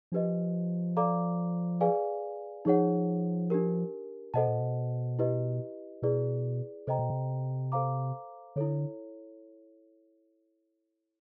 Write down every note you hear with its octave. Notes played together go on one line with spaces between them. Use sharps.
F3 D4 G4 B4 D#5
A4 D5 F5 A#5 D6
G#4 B4 D5 F5 G#5
F3 D#4 G#4 C#5 F#5
D4 G4 A#4
B2 A4 C5 D#5 F#5 A5
A#2
B2
E4 G4 B4 D#5
B2 E4 G#4 B4 D5
C3 A4 C5 D#5 G5 A#5
B2
C3
A4 C5 F5 A#5 D6
D3 E4 A4 C#5